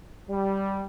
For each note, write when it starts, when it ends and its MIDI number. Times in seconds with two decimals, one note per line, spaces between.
0.29 0.85 55